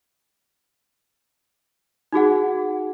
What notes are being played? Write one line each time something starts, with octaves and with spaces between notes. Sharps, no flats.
D#4 F#4 G#4 F#5